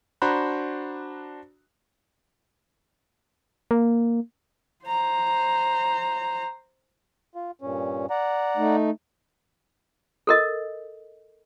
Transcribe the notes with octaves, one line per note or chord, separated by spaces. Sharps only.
D4 F#4 C5 A#5 B5 F#6
A#3
C5 A#5
F4
G2 A#2 C#4
D5 F#5 A#5
A3 D#4
A4 A#4 D#5